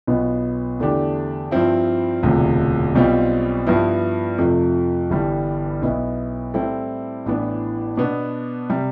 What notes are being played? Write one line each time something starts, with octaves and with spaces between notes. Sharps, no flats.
B1 B2 B3 F4
E2 D3 A3 D4 G4
G2 F3 C4 E4
E1 D2 C3 F3
B1 B2 G3 C4 F4
G2 F3 B3 E4
F2 C3 F3 A3
G1 G2 E3 G3
B1 B2 B3 E4
A2 G3 C4 E4 A4
A1 A2 E3 B3 D4
B2 B3 D4
C3 G3